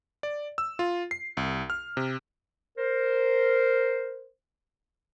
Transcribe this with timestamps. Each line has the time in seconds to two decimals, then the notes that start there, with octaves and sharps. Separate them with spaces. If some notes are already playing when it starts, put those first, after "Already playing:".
0.23 D5
0.58 E6
0.79 F4
1.11 C7
1.37 C2
1.70 F6
1.97 C3
2.78 A#4 C5